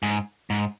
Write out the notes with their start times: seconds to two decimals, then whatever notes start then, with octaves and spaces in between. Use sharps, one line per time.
0.03 G#2
0.50 G#2